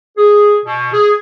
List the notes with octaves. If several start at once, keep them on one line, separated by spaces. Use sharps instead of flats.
G#4
B2
G#4